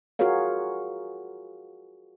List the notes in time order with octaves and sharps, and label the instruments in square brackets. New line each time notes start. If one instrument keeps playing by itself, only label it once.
[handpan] F4 F#4 G#4 A#4 C#5 F5